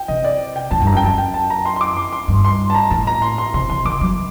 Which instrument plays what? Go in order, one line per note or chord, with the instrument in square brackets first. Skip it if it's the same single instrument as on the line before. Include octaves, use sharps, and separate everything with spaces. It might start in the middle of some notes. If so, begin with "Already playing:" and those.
Already playing: [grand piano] G5
[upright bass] C3 [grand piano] D#5
[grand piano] D5
G5
[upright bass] A2 [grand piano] A5
[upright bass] G2
[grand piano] A#5
[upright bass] F#2
[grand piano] G5
[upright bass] F#2 [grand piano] A5
[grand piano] G5
A5
A#5
C6
C6
D6
C6
C6
[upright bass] G2
[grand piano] C6
A5
A#5
[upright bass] A2 [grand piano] A5
[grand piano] A#5
C6
C6
[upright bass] C3 [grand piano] C6
[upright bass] C3 [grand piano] C6
[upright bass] D#3 [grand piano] D6
[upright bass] F#3